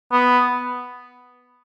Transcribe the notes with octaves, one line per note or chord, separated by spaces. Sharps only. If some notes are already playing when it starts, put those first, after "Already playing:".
B3